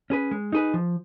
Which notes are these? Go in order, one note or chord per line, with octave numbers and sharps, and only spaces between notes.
C#4 G#4 B4
G#3
D#4 G#4 B4
F3